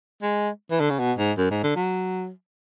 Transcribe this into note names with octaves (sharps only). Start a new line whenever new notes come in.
G#3
E3
D3
C#3
B2
G#2
F#2
G#2
D3
F#3